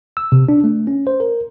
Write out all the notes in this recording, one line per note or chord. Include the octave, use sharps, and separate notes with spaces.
E6
C3
D4
A3
C#4
C5
A#4